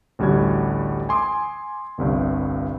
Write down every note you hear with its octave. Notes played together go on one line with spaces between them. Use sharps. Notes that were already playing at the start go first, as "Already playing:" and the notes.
A1 D2 G3 F#4 G#6
G#5 C6 D6 D#6
G1 C2 G2